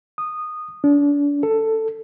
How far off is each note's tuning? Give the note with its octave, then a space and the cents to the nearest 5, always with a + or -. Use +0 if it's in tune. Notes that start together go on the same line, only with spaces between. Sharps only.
D#6 -15
D4 -35
A4 +10